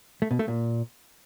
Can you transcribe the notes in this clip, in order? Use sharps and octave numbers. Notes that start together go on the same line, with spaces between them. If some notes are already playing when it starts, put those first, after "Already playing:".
A3
B2
A3
A#2